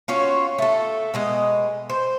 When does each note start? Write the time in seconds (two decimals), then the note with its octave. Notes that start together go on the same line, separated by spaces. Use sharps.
0.08 C#4 F4 F#4 C#5
0.59 A3 A4
1.14 B2 G#3 D#5
1.90 C5